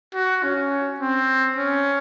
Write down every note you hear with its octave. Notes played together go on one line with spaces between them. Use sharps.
F#4
C#4
C4
C#4